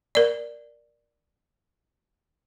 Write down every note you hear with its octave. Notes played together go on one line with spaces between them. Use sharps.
A#4 D5